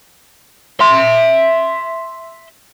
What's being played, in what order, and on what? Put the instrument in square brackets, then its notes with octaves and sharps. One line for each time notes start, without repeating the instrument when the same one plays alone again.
[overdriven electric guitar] E5 C6